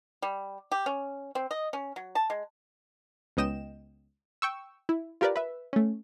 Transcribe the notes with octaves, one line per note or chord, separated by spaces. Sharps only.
G3
G4
C#4
C4
D#5
C#4
F#3
A5
G#3
C#2 B3 D#5 G5 E7
G5 C#6 E6
E4
F4 G4 A#4 B4 D5
B4 E5
A3 C#4